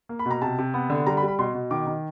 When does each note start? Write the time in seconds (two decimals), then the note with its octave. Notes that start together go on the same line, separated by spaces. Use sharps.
0.09 A#3
0.19 B5
0.26 B2 A#5
0.42 C3 A5
0.58 C3
0.74 B3
0.90 D3
1.07 G3 A#5
1.17 B5
1.23 G3
1.28 B5
1.39 B2 C6
1.54 B2
1.71 D#3 D6
1.87 D#3